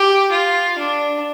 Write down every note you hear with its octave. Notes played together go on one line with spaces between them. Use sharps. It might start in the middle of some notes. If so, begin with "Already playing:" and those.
Already playing: G4
F4
D4